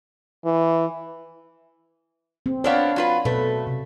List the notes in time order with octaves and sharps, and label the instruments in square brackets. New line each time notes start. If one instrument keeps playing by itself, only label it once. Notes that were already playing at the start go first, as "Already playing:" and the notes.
[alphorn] E3
[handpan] C4
[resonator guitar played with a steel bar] B3 C4 D4 [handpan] C#5 D5 F5
[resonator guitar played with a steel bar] F#3 F4 B4
[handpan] B2 B4 [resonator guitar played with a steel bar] A3
[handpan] C3